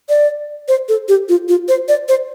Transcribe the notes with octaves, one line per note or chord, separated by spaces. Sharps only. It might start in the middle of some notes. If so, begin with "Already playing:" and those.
D5
C5
A4
G4
F4
F4
C5
D5
C5